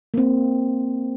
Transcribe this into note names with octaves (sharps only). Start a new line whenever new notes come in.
A#3 C4